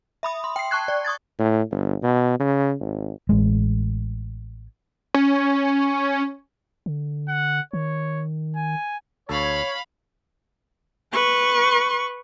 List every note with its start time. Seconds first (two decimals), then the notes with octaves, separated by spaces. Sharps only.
0.23 E5 B5 D#6
0.44 C6
0.56 G5 C7
0.71 A5 C#6 F#6 G#6
0.88 D5
1.05 C#6 D#6 G#6 A6
1.39 A2
1.71 G1
2.03 B2
2.40 C#3
2.80 G#1
3.29 A1 G#3
5.14 C#4
6.86 D3
7.28 F#5
7.73 D#3 C#5
8.56 G#5
9.29 D2 A4 C#5 F5 A5 B5
11.14 B4 C#6